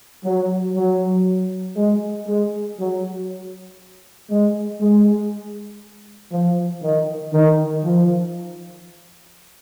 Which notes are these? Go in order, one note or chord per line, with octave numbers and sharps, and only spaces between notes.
F#3
F#3
G#3
G#3
F#3
G#3
G#3
F3
D#3
D#3
F3